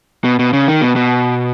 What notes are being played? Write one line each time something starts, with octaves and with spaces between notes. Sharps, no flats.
B2
B2
C#3
D#3
B2
B2